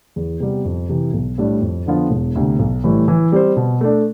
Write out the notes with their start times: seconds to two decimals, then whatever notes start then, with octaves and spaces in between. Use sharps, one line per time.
0.16 E2
0.40 C3 G3 B3
0.65 F2
0.89 C3 E3
1.13 B1
1.38 A2 G3 D4
1.61 F2
1.86 D3 F3 B3 F4
2.11 E1
2.35 D2 C3
2.59 B1
2.84 A2 E3 G3
3.08 E3
3.32 G3 C4 G4 C5
3.57 B2
3.81 A3 D4